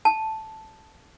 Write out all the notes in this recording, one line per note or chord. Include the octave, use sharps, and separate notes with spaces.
A5